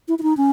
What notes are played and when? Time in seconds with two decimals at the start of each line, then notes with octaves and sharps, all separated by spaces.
0.08 E4
0.19 E4
0.23 D#4
0.37 C#4